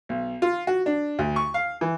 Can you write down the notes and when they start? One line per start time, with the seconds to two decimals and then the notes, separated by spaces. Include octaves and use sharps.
0.09 B1
0.42 F4
0.67 F#4
0.86 D4
1.19 D2
1.36 C#6
1.54 F5
1.81 E3